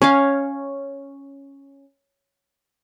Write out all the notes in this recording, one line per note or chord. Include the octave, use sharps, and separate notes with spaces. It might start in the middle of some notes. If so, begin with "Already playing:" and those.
C#4 C#5 F5